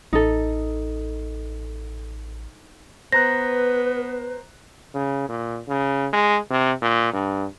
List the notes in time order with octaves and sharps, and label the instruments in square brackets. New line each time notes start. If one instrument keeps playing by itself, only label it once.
[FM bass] A1 [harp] D#4 A4
[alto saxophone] B3 [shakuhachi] B4 [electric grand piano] C5 A#5 F#6 [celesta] A#6
[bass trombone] C#3
A#2
C#3
G#3
C3
A#2
G2